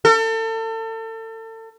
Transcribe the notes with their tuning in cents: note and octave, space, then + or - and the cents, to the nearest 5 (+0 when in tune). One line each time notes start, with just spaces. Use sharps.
A4 +35